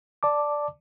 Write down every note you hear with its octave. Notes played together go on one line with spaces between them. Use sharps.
D5 A5 D6